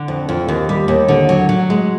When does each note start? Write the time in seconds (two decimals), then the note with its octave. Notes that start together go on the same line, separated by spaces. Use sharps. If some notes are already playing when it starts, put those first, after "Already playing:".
Already playing: D3
0.08 F2
0.29 F2
0.48 D#2
0.69 G3
0.88 D#2
1.08 D3
1.29 F#3
1.49 F#3
1.70 G#3